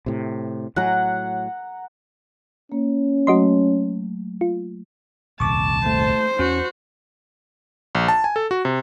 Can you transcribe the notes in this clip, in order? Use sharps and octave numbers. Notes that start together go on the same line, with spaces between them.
A2 C3
A2 F#3 F#5 A#5
A#3 C#4
F#3 A3 F#4 D#5 C6
F4
D#1 C2 F2 A5 C#6 D6
A3 C5
E2 C#4 F#4
A#1
A5
G#5
A4
F#4
C3